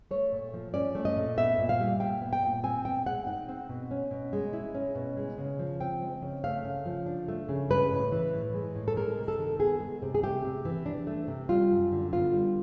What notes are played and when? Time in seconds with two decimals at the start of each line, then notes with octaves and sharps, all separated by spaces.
0.11 A3 C#5
0.32 A#2
0.54 F3
0.74 C#4 D5
0.95 A3
1.05 D#5
1.16 A#2
1.38 B3 E5
1.59 A#2
1.69 F5
1.80 G3
2.00 A#2 G5
2.22 B3
2.33 G5
2.43 A#2
2.64 C4 G#5
2.85 B2 G5
3.06 G#3 F#5
3.27 D#4 F#5
3.48 C4
3.69 B2
3.91 C#4
4.11 B2
4.33 G#3
4.53 E4
4.75 C#4
4.95 B2
5.17 G#3
5.38 C#3
5.59 F3
5.80 C4 G5
6.02 G#3
6.22 C#3
6.44 A3 F5
6.65 C#3
6.86 F3
7.06 D4
7.28 A3
7.49 C#3
7.70 G#3 B4
7.91 A2
8.12 E3
8.33 A2
8.54 G#3
8.76 A2
8.88 A4
8.97 G#3 A#4
9.18 C3
9.28 A4
9.38 D#3
9.60 B3 G#4
9.80 G#3
10.02 C3
10.15 G#4
10.23 A3 G4
10.44 C3
10.65 E3
10.86 D4
11.07 A3
11.28 C3
11.49 G3 F4
11.71 F#2
11.92 D3
12.13 B3 F4
12.33 G3